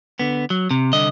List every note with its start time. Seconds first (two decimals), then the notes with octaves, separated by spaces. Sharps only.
0.19 D3 B3
0.50 F#3
0.71 C3
0.93 C2 D3 D#5